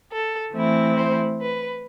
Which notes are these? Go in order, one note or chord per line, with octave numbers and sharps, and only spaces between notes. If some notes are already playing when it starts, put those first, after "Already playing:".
A4
E3 A3 C4 E4
C5
B4